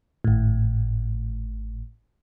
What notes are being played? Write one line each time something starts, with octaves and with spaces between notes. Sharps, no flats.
G#1 A2